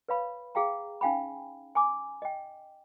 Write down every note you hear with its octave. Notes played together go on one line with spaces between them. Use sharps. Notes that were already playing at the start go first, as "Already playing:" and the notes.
B4 C#5 F5 B5
G#4 F5 G5 A#5
C#4 D#4 F5 G5 G#5 B5
G#5 B5 D6
D#5 G5